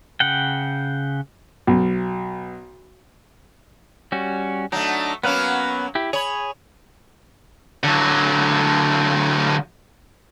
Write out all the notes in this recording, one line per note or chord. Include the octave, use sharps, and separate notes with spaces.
C#3 F#5 G5
B1
G3 C#4 F#4
F#3 A3 D4 D#4
F#3 A#3 B3 C#4 B4 F5
E4 G4
G#4 C#5 B5
D3 F#3